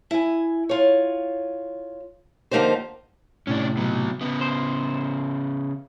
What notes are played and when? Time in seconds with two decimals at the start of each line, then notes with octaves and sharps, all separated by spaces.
0.11 E4 G#5
0.69 F4 C#5
2.51 D3 F3 A#3 D#4 G4 C5
3.47 A2 C3 C#4 D4
3.77 B2 F#3
4.21 C#3 B3
4.41 C5